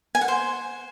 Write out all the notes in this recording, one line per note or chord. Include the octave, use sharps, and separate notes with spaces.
G#5
F#5
C5